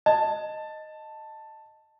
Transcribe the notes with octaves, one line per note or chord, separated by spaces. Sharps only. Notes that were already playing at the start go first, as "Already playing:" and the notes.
D#5 A5